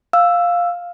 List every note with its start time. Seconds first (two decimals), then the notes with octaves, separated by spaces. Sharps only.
0.13 F5 E6